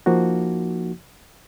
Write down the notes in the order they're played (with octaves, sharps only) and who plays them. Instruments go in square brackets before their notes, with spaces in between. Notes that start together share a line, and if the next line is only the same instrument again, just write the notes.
[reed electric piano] F3 A#3 D#4 F#4